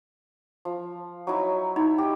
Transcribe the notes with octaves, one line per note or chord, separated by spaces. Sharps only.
F3
F#3 D#4 E4
D#4 E4
G4 D#5